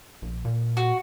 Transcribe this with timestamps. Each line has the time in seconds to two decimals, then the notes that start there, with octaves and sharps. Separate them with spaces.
0.22 A#1
0.45 A#2
0.77 F#4